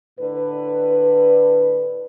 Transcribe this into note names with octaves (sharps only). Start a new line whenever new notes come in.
A2 D3 B4